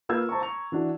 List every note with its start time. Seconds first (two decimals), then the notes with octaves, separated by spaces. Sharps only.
0.09 A#3 F4 B4 F5 E6 G#6
0.29 C5 A5 A#5 C#6
0.41 A#5 C#6 F7
0.72 E3 D4 F#4